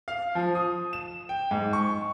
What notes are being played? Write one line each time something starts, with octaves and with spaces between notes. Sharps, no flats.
F5
F3
D#6
E7
G5
G#2
C#6